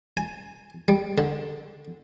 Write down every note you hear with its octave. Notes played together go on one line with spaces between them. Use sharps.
G#5
G3
D3